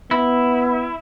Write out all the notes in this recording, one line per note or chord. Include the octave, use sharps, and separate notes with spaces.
B3 E4